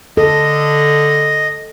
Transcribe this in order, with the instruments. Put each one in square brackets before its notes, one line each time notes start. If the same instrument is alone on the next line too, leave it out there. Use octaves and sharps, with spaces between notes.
[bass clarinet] D3 [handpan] A4 [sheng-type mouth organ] D#5